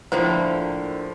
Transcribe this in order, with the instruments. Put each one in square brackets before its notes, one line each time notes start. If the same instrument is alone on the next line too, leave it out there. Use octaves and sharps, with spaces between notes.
[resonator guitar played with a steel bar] A2 D3 A#3 [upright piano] F3 [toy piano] C5